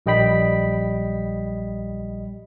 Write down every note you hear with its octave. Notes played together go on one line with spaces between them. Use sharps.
A#1 G3 D#5 G5 B5 B6